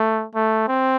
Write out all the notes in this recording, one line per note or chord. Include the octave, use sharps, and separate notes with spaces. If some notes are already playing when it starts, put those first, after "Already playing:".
Already playing: A3
A3
C4